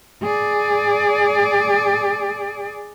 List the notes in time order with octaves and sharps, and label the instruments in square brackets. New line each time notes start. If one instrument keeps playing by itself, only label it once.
[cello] G#4 D5